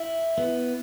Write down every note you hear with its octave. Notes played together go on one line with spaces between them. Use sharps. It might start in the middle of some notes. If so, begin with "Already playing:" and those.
Already playing: E4
B3